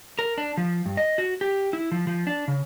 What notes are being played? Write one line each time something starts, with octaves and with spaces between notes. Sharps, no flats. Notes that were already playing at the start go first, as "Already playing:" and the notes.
A#4
D4
F3
G2
D#5
F#4
G4
E4
F3
F3
D4
C#3